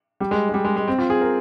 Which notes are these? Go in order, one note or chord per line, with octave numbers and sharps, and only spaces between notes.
G3
G#3
G#3
G3
G#3
G#3
C4
F4
G#4
A#4